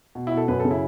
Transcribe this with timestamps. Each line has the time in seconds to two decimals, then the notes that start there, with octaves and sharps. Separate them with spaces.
0.15 B2
0.27 B2 E4
0.37 A4
0.48 F#2 B4
0.60 A4
0.65 C#3
0.71 E4